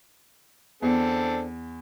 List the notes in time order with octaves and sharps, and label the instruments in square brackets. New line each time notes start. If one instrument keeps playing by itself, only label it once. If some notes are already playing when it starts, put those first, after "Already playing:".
[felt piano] E2 [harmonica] C4 D4 A4